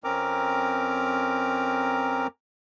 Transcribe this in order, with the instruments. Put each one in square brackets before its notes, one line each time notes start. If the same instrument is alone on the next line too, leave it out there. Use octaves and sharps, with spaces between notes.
[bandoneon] F2 C4 C#4 A#4 A#5 D6